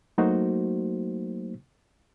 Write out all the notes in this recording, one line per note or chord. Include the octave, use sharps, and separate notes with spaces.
F#3 A3 A#3 D#4 F#4 C5